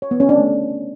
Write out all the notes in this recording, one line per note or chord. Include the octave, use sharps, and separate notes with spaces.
C#5
B3
C#4
D4
A3